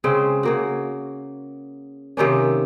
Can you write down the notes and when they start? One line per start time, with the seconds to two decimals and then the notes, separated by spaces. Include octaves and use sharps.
0.04 C#3 G#3 C4
0.43 C#3 A#3 F#4
2.17 C3 D#3 A#3 C#4